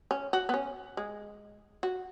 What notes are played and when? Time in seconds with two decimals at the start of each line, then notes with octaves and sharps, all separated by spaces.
0.11 C#4
0.33 F#4
0.49 B3
0.54 C#4
0.97 G#3
1.83 F#4